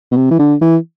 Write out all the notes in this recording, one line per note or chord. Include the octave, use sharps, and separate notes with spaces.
B2
C3
E3
D3
E3